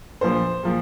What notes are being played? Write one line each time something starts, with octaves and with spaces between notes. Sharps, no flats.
A#1 A#2 F3 C5
A#2 F3